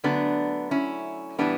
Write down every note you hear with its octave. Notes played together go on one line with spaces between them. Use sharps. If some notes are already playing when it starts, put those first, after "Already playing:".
D3 F#3 A3 B3 D4
C#4 E4
A2 E3 G3 B3 D4